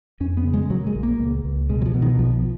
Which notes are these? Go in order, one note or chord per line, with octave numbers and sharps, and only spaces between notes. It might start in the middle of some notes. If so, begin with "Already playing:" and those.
F2 C#4
B3
C#3
G#3
A#2 F#3
G#3
A#1
A#3
C#2
C#2
B2 G#3
F#3
F3
B2
D#3
B1 F3